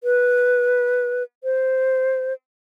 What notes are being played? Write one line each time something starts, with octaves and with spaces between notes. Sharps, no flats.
B4
C5